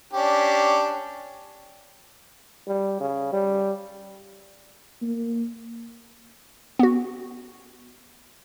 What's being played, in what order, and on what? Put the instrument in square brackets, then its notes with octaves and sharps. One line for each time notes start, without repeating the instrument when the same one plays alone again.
[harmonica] C#4 D4 G4
[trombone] G3
C#3
G3
[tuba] A#3
[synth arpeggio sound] B3 F#4